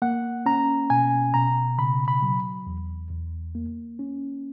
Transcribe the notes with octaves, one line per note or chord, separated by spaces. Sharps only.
A#3 F#5
C#4 A#5
B2 G#5
B2 A#5
C#3 B5
B5
F#3
E2
E2
A#3
C#4